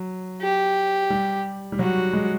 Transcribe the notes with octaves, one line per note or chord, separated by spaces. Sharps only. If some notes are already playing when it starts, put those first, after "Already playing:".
Already playing: F#3
G4
G3
G3
F#3 F#4
G#3